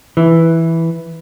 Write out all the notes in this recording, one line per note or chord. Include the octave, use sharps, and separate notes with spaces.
E3